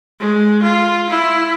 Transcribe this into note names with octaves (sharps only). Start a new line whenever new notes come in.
G#3
F4
E4